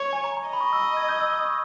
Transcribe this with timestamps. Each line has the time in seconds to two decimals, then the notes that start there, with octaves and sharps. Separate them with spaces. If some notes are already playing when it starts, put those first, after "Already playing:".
Already playing: C#5
0.13 G#5
0.24 A#5
0.37 A#5
0.48 D#5 B5
0.61 C#6
0.73 E6
0.97 G#6
1.09 G6
1.21 E6
1.33 D#6
1.45 C#6